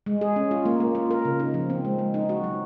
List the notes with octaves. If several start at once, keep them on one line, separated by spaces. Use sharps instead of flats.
G#3
G#4
C#4
F4
A#3
A#3
F4
A#4
C#3
D#4
F3
C4
G#3
G#3
D#4
F#4
F#3